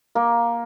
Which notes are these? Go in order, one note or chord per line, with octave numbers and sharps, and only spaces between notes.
A#3